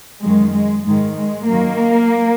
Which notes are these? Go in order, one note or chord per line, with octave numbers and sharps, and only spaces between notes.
F#2 D#3 G#3
G#3
G#2 D#3 G#3
G#3
F#2 D#3 A#3